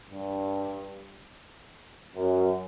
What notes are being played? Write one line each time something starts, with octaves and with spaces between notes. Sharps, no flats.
G2
F#2